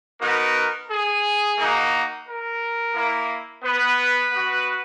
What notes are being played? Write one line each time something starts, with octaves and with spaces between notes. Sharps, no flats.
B3 D#4 F#4 A#4
G#4
A#3 D#4 F#4
A#4
A#3 E4
B3 B4
B3 F#4